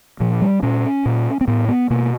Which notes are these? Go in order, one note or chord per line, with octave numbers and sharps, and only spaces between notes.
A#2 F3
G3
A#2 C#4
A#2
C4
A2 B3
B3
B2 A#3